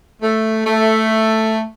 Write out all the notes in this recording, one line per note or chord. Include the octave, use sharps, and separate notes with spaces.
A3
A3